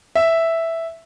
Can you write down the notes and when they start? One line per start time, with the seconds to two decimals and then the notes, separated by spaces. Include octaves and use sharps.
0.15 E5